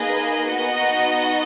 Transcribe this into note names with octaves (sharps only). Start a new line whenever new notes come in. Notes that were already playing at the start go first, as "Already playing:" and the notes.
Already playing: A#3 D#4 G#4 B4 D#5
B3 D#4 F#4 D#5 F#5